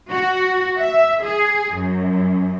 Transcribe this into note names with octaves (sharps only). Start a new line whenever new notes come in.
F#4
E5
G#4
F#2